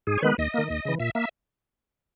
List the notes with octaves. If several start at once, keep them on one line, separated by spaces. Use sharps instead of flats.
G#2 G#4
C#5
D#3 G#3 B3 B4
D#2 D#5
D#3 A#3
D#2
C#3 E3
A#2 E5
A#3 E5